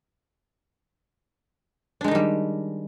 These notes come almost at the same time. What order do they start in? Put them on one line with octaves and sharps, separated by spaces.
D4 G#3 D#4 D#3 G3